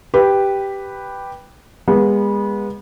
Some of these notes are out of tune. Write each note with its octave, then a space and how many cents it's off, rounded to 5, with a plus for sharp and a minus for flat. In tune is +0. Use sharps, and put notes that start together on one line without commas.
G4 +0 B4 +0
G#3 -35 B3 -25